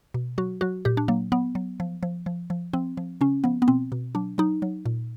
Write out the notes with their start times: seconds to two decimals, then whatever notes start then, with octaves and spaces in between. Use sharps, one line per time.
0.14 B2
0.38 F#3 F#4
0.61 F#3 F#4
0.85 A#2 G4
0.97 D4
1.08 F#3 A#3
1.32 F#3 B3
1.55 F#3
1.80 F3
2.03 F3
2.26 F3
2.50 F3
2.73 F3 C4
2.97 F3
3.21 C#3 C#4
3.44 F3 B3
3.62 B3
3.68 B2 C4
3.92 B2
4.15 F#3 D4
4.38 F#3 D#4
4.62 F#3
4.86 A#2